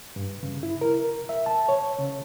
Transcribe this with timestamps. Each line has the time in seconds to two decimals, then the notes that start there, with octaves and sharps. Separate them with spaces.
0.16 G2
0.43 C#3
0.63 E4
0.81 A#4
1.29 E5
1.46 A5
1.69 C#5
1.98 C#3